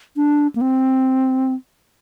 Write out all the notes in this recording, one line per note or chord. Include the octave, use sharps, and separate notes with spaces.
D4
A#3
C4